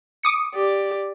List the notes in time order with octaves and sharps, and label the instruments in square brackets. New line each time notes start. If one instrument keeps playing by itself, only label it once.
[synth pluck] D6 D#6 C#7
[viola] G4 D5